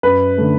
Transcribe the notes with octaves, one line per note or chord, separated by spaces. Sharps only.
F#2 B4
D3 A3